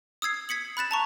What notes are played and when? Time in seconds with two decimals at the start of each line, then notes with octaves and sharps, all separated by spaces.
0.22 D#6 E6 G#6 C7
0.49 G#6 B6 C#7 F#7
0.77 B5 F#6 A6 E7
0.91 A5 A#5 C#6